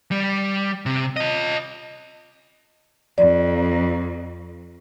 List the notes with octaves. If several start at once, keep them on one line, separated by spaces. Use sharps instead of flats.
G3
C3
F4 D#5
F2 D5